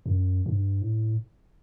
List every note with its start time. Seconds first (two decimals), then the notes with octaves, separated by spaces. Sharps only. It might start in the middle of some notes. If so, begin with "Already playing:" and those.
0.06 E2
0.09 F#2
0.46 G2
0.82 A2